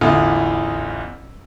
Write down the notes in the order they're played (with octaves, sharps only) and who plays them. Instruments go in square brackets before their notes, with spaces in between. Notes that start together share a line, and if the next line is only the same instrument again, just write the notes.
[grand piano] A1 E2 D3 E3 E4 F4